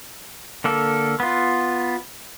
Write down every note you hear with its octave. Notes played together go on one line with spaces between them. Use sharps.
D3 A#3 A4
B3 F4